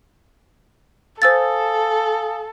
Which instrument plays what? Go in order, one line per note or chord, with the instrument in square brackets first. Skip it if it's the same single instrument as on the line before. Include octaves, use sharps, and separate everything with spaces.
[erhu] A4 [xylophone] C5 E6 A6 [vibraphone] F5 G#5 D#6